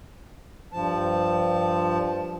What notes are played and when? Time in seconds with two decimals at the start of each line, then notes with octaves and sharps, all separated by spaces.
0.73 G2 F3 A5